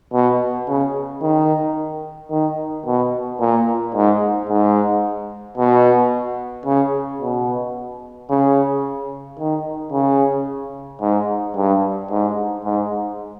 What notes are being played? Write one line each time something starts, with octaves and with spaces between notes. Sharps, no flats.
B2
C#3
D#3
D#3
B2
A#2
G#2
G#2
B2
C#3
B2
C#3
D#3
C#3
G#2
G2
G#2
G#2